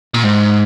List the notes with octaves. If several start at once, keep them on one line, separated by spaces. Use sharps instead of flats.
A#2
G#2